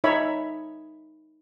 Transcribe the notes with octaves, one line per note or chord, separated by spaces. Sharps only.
D#4 C#5 E5 B5